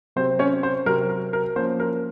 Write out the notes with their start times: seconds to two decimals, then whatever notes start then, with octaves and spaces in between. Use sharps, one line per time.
0.16 C3 F#3 C4 C5
0.39 C#4 C#5
0.63 C5
0.86 C3 F#3 C4 A#4
1.09 A#4
1.33 A#4
1.56 F3 A#3 C#4 C5
1.80 A#4